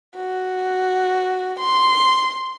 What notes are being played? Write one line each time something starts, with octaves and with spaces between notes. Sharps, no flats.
F#4
C6